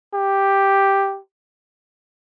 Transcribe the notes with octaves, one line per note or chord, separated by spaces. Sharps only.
G4